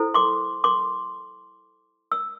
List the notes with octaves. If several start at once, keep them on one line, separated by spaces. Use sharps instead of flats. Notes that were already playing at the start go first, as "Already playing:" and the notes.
Already playing: E4 A4 C5
C6 D6
C6 D6
E6